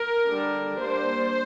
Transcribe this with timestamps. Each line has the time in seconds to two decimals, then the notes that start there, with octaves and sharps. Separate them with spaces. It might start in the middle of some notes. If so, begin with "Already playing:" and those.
Already playing: A#4
0.29 D3 G3 D4
0.80 G3 A#3 D4 C5